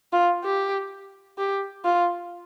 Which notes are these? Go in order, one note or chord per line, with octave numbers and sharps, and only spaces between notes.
F4
G4
G4
F4